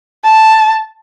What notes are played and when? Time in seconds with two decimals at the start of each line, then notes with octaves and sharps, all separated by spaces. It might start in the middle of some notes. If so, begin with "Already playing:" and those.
0.24 A5